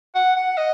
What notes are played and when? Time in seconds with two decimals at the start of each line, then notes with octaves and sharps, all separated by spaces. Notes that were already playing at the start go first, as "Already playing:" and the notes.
0.15 F#5
0.36 F#5
0.58 D#5